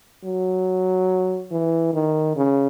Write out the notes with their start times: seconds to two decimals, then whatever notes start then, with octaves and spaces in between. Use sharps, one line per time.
0.24 F#3
1.51 E3
1.93 D#3
2.36 C#3